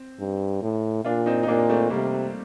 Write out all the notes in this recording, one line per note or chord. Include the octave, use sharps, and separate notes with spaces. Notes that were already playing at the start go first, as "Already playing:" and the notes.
Already playing: C4
G2
A2
A#2 D4 F4
C4 D#4
D#4
A#2 A#3 D4
A3 C4
C3 G3 A#3